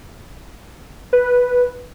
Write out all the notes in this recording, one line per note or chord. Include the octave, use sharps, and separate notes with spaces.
B4